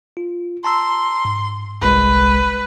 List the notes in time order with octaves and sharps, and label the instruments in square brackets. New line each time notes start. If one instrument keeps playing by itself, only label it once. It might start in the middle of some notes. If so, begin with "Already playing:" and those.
[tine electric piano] F4
[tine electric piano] A5 A#5 E6 [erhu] C6
[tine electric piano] G#2
[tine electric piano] G1 C2 G#3 [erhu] B4